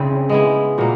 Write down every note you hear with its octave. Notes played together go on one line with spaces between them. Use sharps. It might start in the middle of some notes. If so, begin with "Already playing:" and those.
Already playing: C#3 C4 D4 E4 G#4
G#3 B3 E4
A#2 F#3 A#3